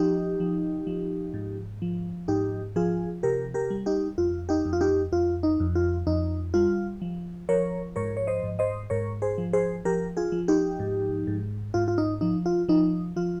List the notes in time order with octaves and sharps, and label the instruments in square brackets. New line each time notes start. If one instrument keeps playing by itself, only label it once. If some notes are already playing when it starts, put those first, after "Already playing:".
Already playing: [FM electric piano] F3 D#4 G4
F3
F3
G#2
F3
G#2 D#4 G4
F3 F4 G#4
C3 G4 A#4
G4 A#4
G3
D#4 G4
F2 F4
D#4 G4
F2
F4
D#4 G4
F2 F4
D#4
F2
F4
F2 D#4
G3 F4
F3
F3 A#4 C#5
G#2 A#4 C#5
C#5
C5 D#5
G#2
C5 D#5
G#2 A#4 C#5
G#4 C5
F3
G#4 C5
F3 G4 A#4
F4 G#4
F3
D#4 G4
G#2
G#2
G#2 F4
F4
D#4
F3 D#4
F4
F3 D#4
F3 F4